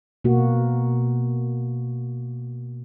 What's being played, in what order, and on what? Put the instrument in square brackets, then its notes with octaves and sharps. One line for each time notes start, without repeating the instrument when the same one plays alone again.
[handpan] B2 A#3 F#4